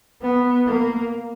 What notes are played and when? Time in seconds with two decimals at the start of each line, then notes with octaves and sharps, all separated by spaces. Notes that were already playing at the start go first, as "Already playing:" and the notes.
0.22 B3
0.66 A#3